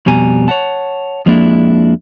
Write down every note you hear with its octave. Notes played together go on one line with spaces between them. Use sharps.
F2 B2 G3 G#5 A#5
C#5 D#5 F#5 A5
F2 F3 G#3 A#3 D4 E4